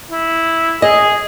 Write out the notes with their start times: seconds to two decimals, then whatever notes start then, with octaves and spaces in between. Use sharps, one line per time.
0.11 E4
0.82 G#4 D#5